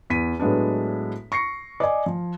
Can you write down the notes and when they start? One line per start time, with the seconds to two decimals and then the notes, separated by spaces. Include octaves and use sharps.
0.10 E2 B6 D#7
0.40 A2 F#3 G#3 B3 D4
1.32 C#6 A#6 C7 C#7
1.80 D5 D#5 G#5
2.06 F3